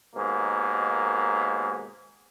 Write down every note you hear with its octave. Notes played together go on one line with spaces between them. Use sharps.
D#2 G#2 B2 A#3